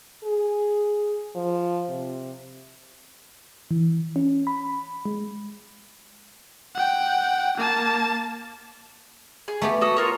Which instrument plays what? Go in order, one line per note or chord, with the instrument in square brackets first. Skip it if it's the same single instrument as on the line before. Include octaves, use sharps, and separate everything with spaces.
[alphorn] G#4
F3
C3
[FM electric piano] E3
C#4
B5
G#3
[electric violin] F#5 G5
A#3 A5
[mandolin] G#4
[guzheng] A3 B3 G4
[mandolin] F#4 A4 D#6
F4 A#4 C#5